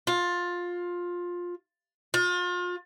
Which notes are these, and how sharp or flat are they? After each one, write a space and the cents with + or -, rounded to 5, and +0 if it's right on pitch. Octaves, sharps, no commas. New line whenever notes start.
F4 +15
F4 +35